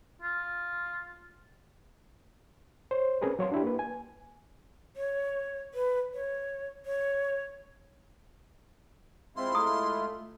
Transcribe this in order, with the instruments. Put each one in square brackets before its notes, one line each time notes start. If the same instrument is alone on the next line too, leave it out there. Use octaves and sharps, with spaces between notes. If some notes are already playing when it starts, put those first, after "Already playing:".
[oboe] F4
[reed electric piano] C5 C#5
C4 C#4 G#4 A#4 B4
F#3 C#5 F5 C6
D4 E4 G4
A#3 B4
G#5
[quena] C#5
B4
C#5
C#5
[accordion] G#3 E4 F4 [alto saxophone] C4 [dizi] C6
[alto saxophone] A3 [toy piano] A#5 D#6